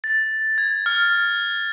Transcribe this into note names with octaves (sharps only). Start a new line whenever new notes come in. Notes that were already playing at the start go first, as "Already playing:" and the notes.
A6
G#6
F6